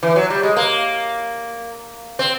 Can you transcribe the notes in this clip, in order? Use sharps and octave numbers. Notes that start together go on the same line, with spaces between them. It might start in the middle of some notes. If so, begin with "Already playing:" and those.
E3
F#3
G3
G#3
A#3
C4